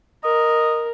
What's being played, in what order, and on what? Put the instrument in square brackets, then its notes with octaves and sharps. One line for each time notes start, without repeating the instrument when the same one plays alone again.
[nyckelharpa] A#4 [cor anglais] D#5